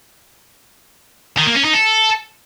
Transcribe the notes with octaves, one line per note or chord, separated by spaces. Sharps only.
D#3
A#3
C#4
D#4
A4